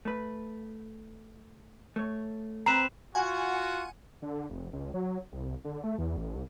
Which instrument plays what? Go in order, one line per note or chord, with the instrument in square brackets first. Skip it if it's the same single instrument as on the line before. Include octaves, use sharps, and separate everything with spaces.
[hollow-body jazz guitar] A3 B4
A3 C#5
[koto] C4 B4 [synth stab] A#5 [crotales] C7 E7
[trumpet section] F4 F#4 [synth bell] F#5 G#5
[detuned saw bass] D3
F1
C#2
F#3
C2
D3
A3
E2
A1
C2